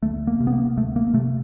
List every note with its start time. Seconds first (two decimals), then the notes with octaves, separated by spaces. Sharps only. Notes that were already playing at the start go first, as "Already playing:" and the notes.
0.03 D2 A3
0.27 A#3
0.40 C3
0.47 B3
0.53 A#3
0.77 D2 A3
0.96 A#3
1.14 C3 A3